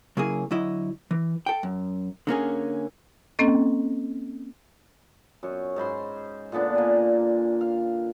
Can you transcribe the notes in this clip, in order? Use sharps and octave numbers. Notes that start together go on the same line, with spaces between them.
C#3 F#3 A#3 E4 G#4
D3 F#3 E4 D#5
E3
A4 G5
F#2
D3 A#3 C#4 G#4
A#3 C4 C#4 A4 D#5
F#2 C#5
G#2 C5 B5 C6
A#2 D3 B3 D4
A#3 G#5
F5